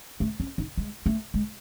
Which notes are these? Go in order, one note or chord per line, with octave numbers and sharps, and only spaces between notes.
A3
C#4
D#4
G#3
A3
G#3